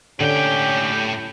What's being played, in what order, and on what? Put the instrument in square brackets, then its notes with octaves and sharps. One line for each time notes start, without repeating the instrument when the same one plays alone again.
[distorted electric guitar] A2 G5 [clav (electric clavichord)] D3 [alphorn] C#4 [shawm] G4